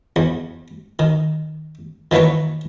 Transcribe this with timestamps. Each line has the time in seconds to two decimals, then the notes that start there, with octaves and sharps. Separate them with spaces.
0.16 E2
0.99 D#3
2.11 D#3 E3 A#3 B4 C#5